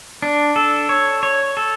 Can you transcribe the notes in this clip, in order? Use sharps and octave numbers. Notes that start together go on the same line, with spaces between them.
D4
A4
C#5
C#5
A4